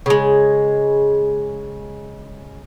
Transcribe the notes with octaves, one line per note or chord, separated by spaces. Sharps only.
C#3 G#3